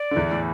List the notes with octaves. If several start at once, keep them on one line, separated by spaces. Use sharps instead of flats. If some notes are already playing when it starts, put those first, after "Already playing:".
Already playing: D5
D3
E2 E3
A2